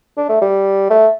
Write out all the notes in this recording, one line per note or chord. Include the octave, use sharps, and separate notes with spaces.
D4
A3
G3
A3